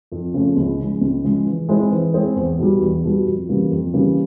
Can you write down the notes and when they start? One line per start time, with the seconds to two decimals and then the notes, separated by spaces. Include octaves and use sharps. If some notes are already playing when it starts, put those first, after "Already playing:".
0.12 F2
0.34 C#3 F3 A3 C#4
0.57 C#2
0.79 C#3 F3 G#3
1.01 C#2
1.24 C#3 F3 G#3
1.46 E3
1.69 G#3 C4 E4 G#4
1.91 E3
2.14 G#3 C4 E4 G#4
2.36 E2
2.59 B2 G3
2.81 E2
3.04 B2 G3
3.26 F2
3.49 C#3 E3 G3 A#3
3.71 F2
3.94 C#3 E3 G3 A#3